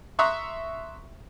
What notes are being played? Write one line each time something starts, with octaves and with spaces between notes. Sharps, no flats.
E5 A#5 C6 C#6 D#6 F#6